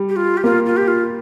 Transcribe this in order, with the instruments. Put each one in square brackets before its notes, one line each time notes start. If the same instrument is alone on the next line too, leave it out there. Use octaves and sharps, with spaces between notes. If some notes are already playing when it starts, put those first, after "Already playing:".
Already playing: [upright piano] G3
[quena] G4
F4
G4
[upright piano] A#3 [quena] F4
[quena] F4
G4
F4